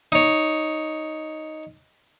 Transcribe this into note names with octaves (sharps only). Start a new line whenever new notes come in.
D#4 C#5